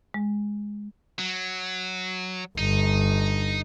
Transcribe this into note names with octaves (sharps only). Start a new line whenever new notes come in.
G#3
F#3
G1 D#4